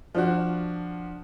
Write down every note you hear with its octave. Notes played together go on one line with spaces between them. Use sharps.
F3 D4 F#4